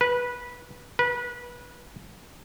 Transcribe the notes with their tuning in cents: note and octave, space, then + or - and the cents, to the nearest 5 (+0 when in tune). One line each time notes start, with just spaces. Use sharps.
B4 -15
B4 -25